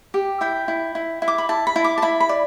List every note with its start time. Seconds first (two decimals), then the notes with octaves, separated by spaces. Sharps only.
0.14 G4
0.41 E4 G5
0.68 E4
0.95 E4
1.22 E4
1.28 D6
1.38 B5
1.49 E4 A5
1.67 B5
1.76 E4
1.84 D6
1.98 A5
2.02 E4 B5
2.20 B5
2.29 D5